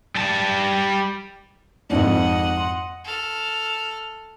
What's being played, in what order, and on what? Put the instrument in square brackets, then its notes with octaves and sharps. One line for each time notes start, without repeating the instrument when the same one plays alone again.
[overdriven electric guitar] G3 A5
[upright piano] G#1 F2 G#2 [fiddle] D#5 F#5
[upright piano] C6
[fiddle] A4 F6